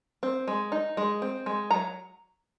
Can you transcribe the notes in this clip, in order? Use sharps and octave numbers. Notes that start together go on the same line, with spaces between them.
C4
G#3
D#4
G#3
C4
G#3
F#3 A#5